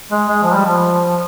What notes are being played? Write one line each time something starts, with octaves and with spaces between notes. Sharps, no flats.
G#3
G#3
F3
G3
F3